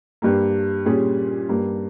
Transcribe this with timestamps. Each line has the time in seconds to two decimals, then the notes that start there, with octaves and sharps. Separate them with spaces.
0.22 G2 G3 A#3
0.86 A#2 G3 C#4 G#4
1.49 G2 G3 A#3